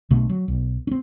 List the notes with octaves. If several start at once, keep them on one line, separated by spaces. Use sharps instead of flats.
B1 B2 D3 A3
F#3
B1
C4 C#4